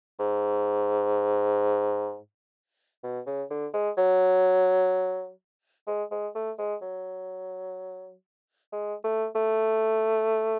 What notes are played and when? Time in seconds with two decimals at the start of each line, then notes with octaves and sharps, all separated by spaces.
0.19 G#2
3.03 B2
3.27 C#3
3.50 D3
3.74 G#3
3.97 F#3
5.87 G#3
6.11 G#3
6.35 A3
6.59 G#3
6.82 F#3
8.72 G#3
9.04 A3
9.35 A3